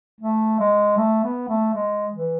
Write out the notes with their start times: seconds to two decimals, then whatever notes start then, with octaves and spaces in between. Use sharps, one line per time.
0.21 A3
0.59 G#3
0.97 A3
1.24 B3
1.49 A3
1.74 G#3
2.13 E3